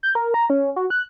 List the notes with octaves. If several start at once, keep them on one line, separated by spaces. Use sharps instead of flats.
G6
A#4
A#5
C#4
F#4
F#6